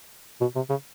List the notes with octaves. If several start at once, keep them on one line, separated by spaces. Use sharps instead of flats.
B2
C3
C#3